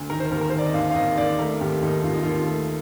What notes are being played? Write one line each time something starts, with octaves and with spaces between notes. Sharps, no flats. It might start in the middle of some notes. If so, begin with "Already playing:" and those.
Already playing: D2
D#3 A#4
C5
D#2 A#4
A#4
C5
D#3
D5
D#5
D#2 F5
F5
D#2 D#5
D#2 D5
A3 A#4
D#2 G4
D#2 D#4
D#2 F4
D#4
D#2 F4
A3